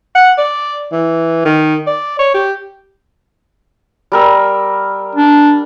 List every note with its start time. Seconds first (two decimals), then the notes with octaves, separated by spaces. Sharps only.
0.15 F#5
0.38 D5
0.92 E3
1.45 D#3
1.87 D5
2.19 C#5
2.34 G4
4.12 G3 A#4 E6
5.15 D4